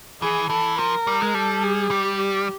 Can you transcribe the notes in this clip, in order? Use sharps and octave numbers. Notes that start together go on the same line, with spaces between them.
E3 G#4
E3 A4
F3 A#4
G3
G#3
G3 A4
G#4
G3 G4